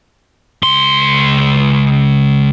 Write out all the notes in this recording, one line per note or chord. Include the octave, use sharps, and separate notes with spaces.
C#2 C6